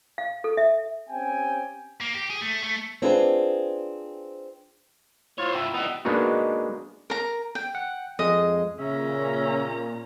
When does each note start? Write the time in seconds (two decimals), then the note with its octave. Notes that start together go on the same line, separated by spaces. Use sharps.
0.18 F5
0.44 A4
0.57 E5
1.09 C4 C#4 G4 G5 G#5
2.00 A#3
2.14 G4
2.30 G#4
2.41 A3
2.63 A3
3.02 C4 D4 F4 G#4 B4
5.38 E4 F4 C5 C#5
5.53 G2 E4 E5 G5 A#5
5.74 G3 B3 D#4
6.05 G#3 A#3 B3 D4 D#4 F#4
7.10 A#4 A#5
7.55 G5
7.75 F#5
8.19 F2 G#3 D#5
8.79 A#2 C#3 C#4 E5 A#5